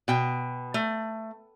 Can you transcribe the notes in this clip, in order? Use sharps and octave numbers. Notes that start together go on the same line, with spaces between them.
B2 G5
A3